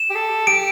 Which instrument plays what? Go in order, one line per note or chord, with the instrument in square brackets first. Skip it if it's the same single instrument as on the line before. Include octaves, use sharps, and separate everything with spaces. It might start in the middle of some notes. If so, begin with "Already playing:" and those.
Already playing: [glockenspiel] E7
[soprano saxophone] G4
A4
[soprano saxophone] G4 [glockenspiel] D7